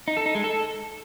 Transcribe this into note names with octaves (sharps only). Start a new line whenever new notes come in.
D#4
A4
D#4
G#3
A4